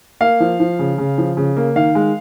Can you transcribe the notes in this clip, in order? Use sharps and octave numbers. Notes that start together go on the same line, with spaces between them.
A#3 F5
F3
F3
C#3
C#3
F3
C#3
A#3
D#3 F5
G#3